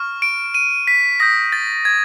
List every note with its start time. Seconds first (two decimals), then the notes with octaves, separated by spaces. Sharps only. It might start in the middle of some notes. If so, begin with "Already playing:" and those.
Already playing: C#6 F6
0.22 D7
0.54 D#7
0.87 B6
1.20 D#6 G6 A#6
1.52 A6
1.85 G#6